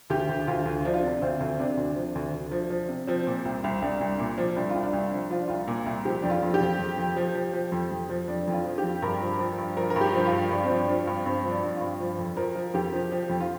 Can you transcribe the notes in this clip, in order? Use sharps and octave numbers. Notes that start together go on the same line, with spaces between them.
D2 G4
D2
D2 F4
D2
F3 D4
F4
C3 D4
D2 C4
D2
C3 D4
D2
F3
D2
D2
F3
F3
C3
F3 C4
A#2
C2
C2
C2 D4
C2
A#2
F3
C2 D4
F4
C2
D4
C2
F3
F3 F4
D4
C2 F4
A#2
C2
F3 G4
F2 D4
F4
F2
G4
F2
F2
F2
F3
F3
F3
F2
F2
F3
F2 D4
F2
F4
F3
G4
F2
G2 A#4
F3
F3
G2
F3 A#4
A#4
G2
G4
F3
F4
G2
G2 D4
C4
F3
D4
F3
G2
G2 C4
F3
D4
G2
F4
G2
F3
F2
F3 A#4
F3
F2 G4
F3
F3
F2
F4